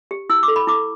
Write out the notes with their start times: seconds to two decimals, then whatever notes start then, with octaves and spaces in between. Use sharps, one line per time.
0.11 G4
0.29 E4 E6
0.43 D6
0.48 A4
0.56 B5
0.67 E4 D6